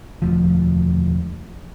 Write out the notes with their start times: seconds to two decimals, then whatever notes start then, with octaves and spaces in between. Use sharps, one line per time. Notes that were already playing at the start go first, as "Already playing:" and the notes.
0.22 E1 D2 F3